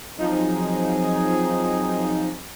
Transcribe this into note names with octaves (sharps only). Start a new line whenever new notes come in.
F3 F#3 C4 D#4 G#4